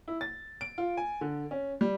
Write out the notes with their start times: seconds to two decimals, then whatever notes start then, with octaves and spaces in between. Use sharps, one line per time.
0.08 E4
0.21 A6
0.61 D7
0.78 F4
0.97 G#5
1.21 D3
1.51 C#4
1.81 G3